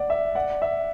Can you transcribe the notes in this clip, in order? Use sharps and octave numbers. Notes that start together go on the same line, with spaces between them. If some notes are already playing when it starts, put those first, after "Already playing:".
Already playing: D5 F#5
E5
D5 F#5
E5